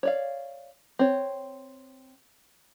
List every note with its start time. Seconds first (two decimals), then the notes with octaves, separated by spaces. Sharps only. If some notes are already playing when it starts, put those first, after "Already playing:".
0.03 C#5 D5 F5
0.99 C4 C#5